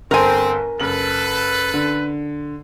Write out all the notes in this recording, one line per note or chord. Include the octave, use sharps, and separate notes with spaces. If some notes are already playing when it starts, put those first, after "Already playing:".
G1 C4 A4 A#4 C5 G#5
F#1 A4 B4 F#7
D3